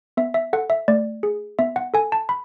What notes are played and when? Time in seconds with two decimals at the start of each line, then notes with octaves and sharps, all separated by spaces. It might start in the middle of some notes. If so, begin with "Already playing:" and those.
0.17 B3 E5
0.34 E5
0.53 A4 F#5
0.70 E5
0.88 A3 D5
1.23 G#4
1.59 B3 E5
1.76 F#5
1.94 A4 G#5
2.12 A5
2.29 B5